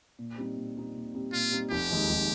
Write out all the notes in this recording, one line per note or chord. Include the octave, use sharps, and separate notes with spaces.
A#2
G3 C4 D#4
A#2
G3 C4 D#4
A#2
G3 C4 D#4
A#2 F4
G3 C4 D#4
F1 G4
D#2 D#3 G#3
F1